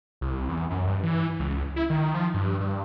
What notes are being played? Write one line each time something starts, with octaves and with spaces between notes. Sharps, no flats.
C2
E2
F#2
G2
E3
C#2
E4
D#3
F3
G2
G2